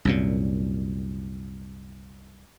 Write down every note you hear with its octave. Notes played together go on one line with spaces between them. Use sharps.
C2 F#2 A#2